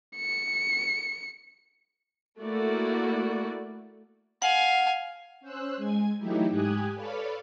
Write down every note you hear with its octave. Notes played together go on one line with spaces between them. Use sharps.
C#7
A3 A#3 E4 F#4 D5
F5 F#5 G#5
C#4 C5 E6 F#6
G#3 G#5 G#6
E3 F#3 A3 D#4 E4 G4
G#2 G4 G#5 D#6 F#6 G#6
A4 B4 C#5 D5 F5 B5